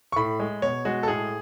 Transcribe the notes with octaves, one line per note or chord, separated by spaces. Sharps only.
C#6
A2 B5
G#3
B2 C#5
G#3 F#4
A4
A2 G#4